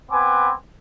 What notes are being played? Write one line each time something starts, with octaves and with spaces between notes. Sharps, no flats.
B3 C4 B4 G#5 D6